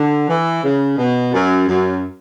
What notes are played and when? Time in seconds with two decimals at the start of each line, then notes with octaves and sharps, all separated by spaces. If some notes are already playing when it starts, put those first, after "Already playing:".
Already playing: D3
0.28 E3
0.63 C#3
0.98 B2
1.33 F#2
1.68 F#2